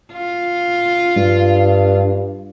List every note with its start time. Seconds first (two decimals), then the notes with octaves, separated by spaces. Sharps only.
0.13 F4
1.17 G2